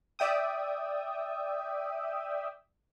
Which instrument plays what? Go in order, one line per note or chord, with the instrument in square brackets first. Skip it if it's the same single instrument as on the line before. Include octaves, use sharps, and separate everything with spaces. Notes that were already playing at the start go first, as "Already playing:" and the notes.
[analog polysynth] D5 E5 G5 D#6